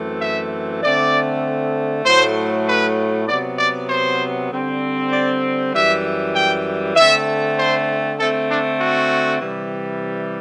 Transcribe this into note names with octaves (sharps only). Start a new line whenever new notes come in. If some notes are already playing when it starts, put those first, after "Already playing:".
Already playing: F#2 E3 A3 C4
E5
D3 A3 C4 D5
A2 F#3 A3 C5
B4
C3 F#3 B3 D5
D5
C5
D3 G3 C4
D5
F#2 E3 G3 E5
G5
D3 A3 C4 E5
C5
D3 A3 C4 A4
D4
F#4
C3 E3 G3